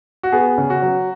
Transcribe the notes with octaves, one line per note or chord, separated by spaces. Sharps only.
F#4
B3 G#4
C#3
F#4
F#3